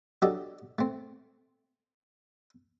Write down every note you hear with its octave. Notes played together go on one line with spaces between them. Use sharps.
F#3 D4 G4 A4 D#5
A3 C4